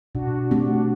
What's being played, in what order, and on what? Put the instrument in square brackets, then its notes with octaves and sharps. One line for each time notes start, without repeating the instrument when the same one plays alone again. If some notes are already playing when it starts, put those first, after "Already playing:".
[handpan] B2 [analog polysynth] D4 F#4
[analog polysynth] D4 F#4
[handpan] A3 C4 G4
[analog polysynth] D4 F#4